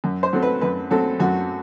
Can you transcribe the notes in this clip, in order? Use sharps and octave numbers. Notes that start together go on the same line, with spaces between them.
F#2
C5
F#3 A3 C4
B4
F#2 B4
F#3 A3 C4 A4
F#2 F#4